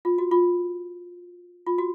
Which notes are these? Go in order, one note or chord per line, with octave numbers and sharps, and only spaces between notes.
F4
F#4
F4
F4
F#4